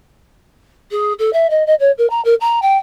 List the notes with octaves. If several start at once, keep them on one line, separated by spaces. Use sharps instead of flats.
G#4
A4
E5
D#5
D#5
C#5
A#4
A#5
A#4
A#5
G5